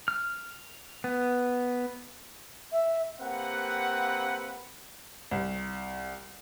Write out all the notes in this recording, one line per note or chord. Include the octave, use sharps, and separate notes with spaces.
F6
B3
E5
A#3 C4 G4 B4 F#5
C2